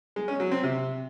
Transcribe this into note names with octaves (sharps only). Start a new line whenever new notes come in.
G#3
C#4
F#3
C4
C3